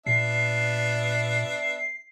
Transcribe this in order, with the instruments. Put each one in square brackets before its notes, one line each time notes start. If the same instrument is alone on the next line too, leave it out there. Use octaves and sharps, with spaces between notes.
[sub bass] A#2 [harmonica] B3 D4 E5 [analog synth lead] C7